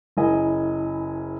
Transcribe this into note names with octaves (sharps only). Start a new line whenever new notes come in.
F#1 E4 A#4 D#5 G#5